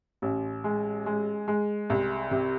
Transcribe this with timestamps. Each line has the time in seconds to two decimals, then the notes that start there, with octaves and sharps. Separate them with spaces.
0.22 A1
0.64 G#3
1.06 G#3
1.48 G#3
1.90 C2
2.31 C3